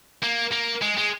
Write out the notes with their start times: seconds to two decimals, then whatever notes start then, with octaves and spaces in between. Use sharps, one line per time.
0.23 A#3
0.52 A#3
0.82 G#3
0.97 G#3